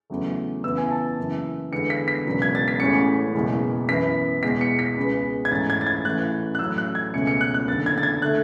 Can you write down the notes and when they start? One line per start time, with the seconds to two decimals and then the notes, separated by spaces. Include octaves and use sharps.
0.10 E2 C#3 F#3 A3
0.63 E2 C#3 E3 B3 E6
0.78 G#5
0.91 A5
1.18 F#1 F#2 E3
1.72 E2 D3 G#3 B3 C#7
1.90 B6
2.08 B6
2.26 E1 E2 C#3 F#3 B3
2.42 G#6
2.55 A6
2.68 B6
2.80 A1 A2 G#3 C#4 C#7
3.34 F#1 E2 B2 G#3
3.88 F#2 E3 B3 B6
4.43 E2 B2 G#3 B6
4.61 C#7
4.79 B6
4.97 C#2 C#3 G#3 B3
5.45 G#6
5.51 G#2 E3 A3 C#4 A6
5.70 G#6
5.81 A6
5.87 G#6
6.05 A1 A2 E3 F#6
6.55 F#6
6.59 A1 A2 F#3 E6
6.78 F#6
6.95 G#6
7.14 C#2 B2 A3 C#4 C#7
7.27 C#7
7.41 F#6
7.54 F#6
7.68 F#1 E2 D3 A6
7.86 G#6
7.98 A6
8.03 G#6
8.22 D3 A3 F#6